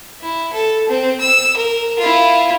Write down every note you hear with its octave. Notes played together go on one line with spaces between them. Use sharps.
E4
A4
C4
E6
A#4
E4 F4